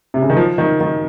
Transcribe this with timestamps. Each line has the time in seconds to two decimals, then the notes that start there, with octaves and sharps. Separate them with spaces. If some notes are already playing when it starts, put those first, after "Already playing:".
0.14 C3
0.22 C#3
0.30 D#3
0.37 F3
0.58 D#3
0.81 D#3